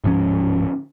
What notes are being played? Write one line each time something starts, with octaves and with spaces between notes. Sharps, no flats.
D1 G#2 F3 C#4